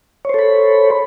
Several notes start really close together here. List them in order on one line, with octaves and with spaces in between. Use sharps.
C#5 C5 A4 B5